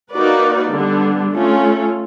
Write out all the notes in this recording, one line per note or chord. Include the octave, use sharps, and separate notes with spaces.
A#3 D#4 F#4 B4 D5
D3 G3 B3 D4
A3 C#4 F4